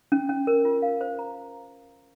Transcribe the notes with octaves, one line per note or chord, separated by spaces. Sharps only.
C#4
C#4
A#4
F4
F5
C5
A#5